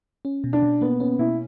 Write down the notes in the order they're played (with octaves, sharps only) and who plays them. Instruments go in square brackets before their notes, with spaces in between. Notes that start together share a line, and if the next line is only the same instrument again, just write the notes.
[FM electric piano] C#4
B2
[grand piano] D4
[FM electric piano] B2
[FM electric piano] A#3 [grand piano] B3
[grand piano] B3 [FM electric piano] C#4
[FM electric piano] B2 [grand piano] E4